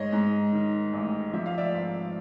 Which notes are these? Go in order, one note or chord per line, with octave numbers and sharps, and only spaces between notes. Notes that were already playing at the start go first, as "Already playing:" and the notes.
Already playing: G#2 C#5 D#5
G#2
D#3
A1
F3 E5
F5
D5 E5
G#1